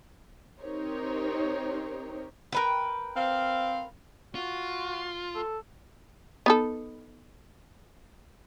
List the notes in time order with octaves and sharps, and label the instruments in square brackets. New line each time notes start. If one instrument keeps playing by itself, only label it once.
[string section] C4 D#4 G4 A#4 C5 C#5
[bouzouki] A#4 B4 G5
[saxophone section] C4 F5
[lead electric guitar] F4 [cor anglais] F#4
[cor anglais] A4
[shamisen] B3 D#4 A4